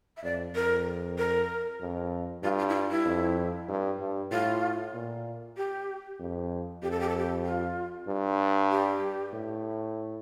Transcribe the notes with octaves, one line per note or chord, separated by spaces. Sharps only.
E5
F2 D5
F2 A#4
A#4
F2
G2 F4
F4
E4
F4
E4
F2
G2
G2
A2 F4
A#2
G4
F2
F2 G4
A4
G4
A4
G4
F4
G2
G4
A2